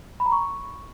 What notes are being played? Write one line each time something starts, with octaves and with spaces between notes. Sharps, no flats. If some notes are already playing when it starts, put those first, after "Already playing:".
B5
A#5
C#6